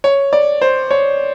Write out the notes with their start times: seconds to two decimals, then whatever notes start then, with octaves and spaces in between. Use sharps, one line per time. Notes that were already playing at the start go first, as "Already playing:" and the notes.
0.04 C#5
0.33 D5
0.61 C5
0.91 C#5